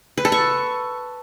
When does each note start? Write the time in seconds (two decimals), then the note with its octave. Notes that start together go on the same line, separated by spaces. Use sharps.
0.18 B4
0.25 A4
0.32 C#6